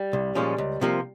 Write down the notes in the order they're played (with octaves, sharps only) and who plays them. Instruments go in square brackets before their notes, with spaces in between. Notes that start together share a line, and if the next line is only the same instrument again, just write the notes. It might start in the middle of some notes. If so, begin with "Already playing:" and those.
Already playing: [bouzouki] G3
[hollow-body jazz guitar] C2
A#2 F3 G#3 C#4
C#2
C3 F3 A#3